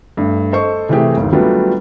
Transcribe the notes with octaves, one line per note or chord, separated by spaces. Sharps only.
G2 A3
A4 C5 D#5 C#6
C3 E3 A3 C4 G4 G#4
G1 D#2
F#3 G3 A3 B3 D4 F4